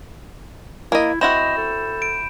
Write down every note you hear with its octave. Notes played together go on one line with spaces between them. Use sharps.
A#3 E4 D#5
C4 E4 F#4 D#5 B5 G6 E7
A4
D7